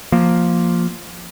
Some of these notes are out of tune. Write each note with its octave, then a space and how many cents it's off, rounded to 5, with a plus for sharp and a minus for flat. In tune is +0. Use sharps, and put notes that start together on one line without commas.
F3 +0 A#3 +0